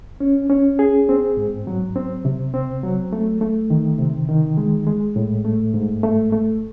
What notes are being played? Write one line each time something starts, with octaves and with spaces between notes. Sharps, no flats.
C#4
C#4
G#4
C4
G#2
F#3
C4
C3
C4
F#3
A3
A3
D#3
C3
D#3
G#3
G#3
A2
A3
G#2
A3
A3